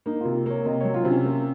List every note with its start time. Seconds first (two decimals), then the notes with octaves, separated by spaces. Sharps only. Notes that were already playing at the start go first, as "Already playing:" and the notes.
0.06 A#3 D#4
0.21 C3 F4
0.46 A#3 C#5
0.65 C3 D#5
0.81 F#3 C#5
0.94 F4
1.03 C3 C4
1.10 C#4
1.25 A#3